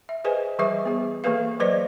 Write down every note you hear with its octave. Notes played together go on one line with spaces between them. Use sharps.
E5
G#4 B4 C5 D#5 G#5
E3 G3 G#4 B4 E5 D6
B3 G#4
E3 A#3 G#4 A4 B4 F5
F#3 B4 C5 D5 D#5